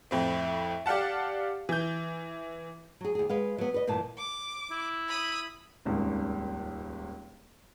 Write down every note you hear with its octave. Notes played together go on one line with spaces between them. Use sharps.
F2 A2 C4
G4 D5 F5 F#5 A5
E3 G6
F#3 G#4
D#2 G#4
G#3 B4 F5
F#3 B3
B4 D#5
G2 A#2 D#3 E3 A5
D6
E4
B5 D#6
D#1 G#1 C#2